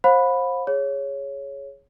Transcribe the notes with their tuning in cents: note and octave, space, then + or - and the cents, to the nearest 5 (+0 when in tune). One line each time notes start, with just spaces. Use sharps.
C5 +25 F5 +40 B5 +0
G#4 +0 C#5 +0